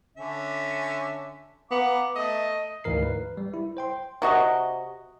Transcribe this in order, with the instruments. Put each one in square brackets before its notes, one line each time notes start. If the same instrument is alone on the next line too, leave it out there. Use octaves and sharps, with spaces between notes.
[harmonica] D3 C#4 E5
[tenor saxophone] B3 [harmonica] F5 A#5 D6
[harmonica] A3 [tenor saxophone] D#5
[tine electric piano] D2 G#2 E3 A#4 C7
B4
G3
E4
C5 G5 C6
[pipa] C3 F#4 D#5